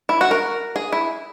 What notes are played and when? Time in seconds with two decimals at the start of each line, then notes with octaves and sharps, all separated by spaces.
0.09 E4
0.21 F#4
0.31 A#4
0.76 G#4
0.92 E4